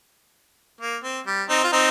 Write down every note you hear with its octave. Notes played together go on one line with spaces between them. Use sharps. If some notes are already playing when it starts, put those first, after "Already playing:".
A#3
C4
G3
C4 D#4
F4
C4 D#4